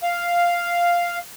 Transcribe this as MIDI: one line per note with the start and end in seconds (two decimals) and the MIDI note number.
0.03 1.19 77